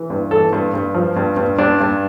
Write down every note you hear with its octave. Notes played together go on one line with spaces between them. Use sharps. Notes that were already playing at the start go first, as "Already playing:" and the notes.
Already playing: E3
G2
E3 A4
G2
G2
F3
G2
G2
G2 D4
G2